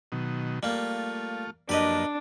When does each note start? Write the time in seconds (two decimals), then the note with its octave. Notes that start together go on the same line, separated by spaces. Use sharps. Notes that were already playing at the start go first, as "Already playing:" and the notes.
0.12 B2 D#3 F#3
0.63 G3 A3 A#3 F4
1.69 F#2 F3 A#3 D4 G4 B4 D#5